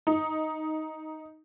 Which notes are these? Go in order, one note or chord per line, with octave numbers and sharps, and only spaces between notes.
D#4